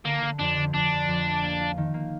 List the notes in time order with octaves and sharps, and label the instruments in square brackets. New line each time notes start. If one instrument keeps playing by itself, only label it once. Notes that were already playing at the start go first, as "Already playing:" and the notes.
[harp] D3 [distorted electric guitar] A#3
[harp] D3
[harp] F2 [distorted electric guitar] D4
[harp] D3
[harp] F2 [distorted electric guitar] D4
[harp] F2
F2
A3
A#3
F4
D#3
A#3